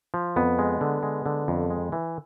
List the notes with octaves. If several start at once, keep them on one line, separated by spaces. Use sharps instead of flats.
F3
F2 B3
G#3
D3
G#3
D3
F2
G#3
E3